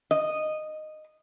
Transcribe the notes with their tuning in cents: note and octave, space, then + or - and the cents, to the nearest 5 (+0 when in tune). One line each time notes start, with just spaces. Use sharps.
D#5 -10